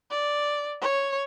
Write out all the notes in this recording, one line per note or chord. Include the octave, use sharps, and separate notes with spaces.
D5
C#5